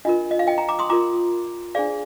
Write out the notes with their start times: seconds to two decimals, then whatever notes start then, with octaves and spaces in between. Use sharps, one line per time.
0.05 D4 F4 A#4 D#5
0.31 D#5
0.39 F5
0.47 D#5 G5
0.58 G5 A#5
0.68 A#5 D6
0.79 C6 D#6
0.89 F4 A#4 A#5 D6
1.75 D4 G#4 C5 D5 F5